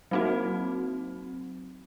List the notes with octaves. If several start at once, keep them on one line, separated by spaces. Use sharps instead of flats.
F#3 A#3 C4 D#4 F#4